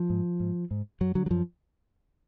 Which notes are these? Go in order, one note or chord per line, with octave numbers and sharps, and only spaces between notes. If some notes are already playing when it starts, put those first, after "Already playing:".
Already playing: F3
G#2
G#2
G#2
F#2 F#3
D3 F#3
F#3
F#2 F3